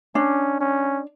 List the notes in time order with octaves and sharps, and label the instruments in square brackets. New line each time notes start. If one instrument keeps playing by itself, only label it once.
[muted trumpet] C#4 [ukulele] D4
[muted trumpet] C#4